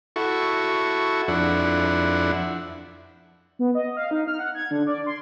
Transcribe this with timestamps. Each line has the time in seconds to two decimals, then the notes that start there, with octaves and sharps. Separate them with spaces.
0.16 E4 F#4 A4 C#6
1.28 F2 D4 E4 F#5
3.59 B3
3.75 D#5
3.97 F5
4.11 D#4
4.27 F6
4.39 F#5
4.55 G#6
4.71 D3
4.87 D5
5.06 C6